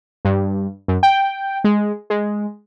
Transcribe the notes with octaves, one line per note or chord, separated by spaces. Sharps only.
G2
F#2
G5
G#3
G#3